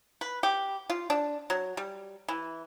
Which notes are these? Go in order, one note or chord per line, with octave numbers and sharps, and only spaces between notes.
B4
G4
F4
D4
F#3
G3
E3